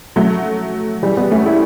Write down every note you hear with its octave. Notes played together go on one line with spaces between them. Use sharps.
F#3 A3
E3 G3
G3 B3
A3 C#4
E4 G4